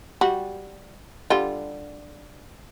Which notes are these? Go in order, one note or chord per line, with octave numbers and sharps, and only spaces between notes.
G3 F#4
D3 G3 F4